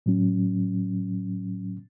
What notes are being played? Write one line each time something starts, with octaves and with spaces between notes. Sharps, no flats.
A2 F#3 C#4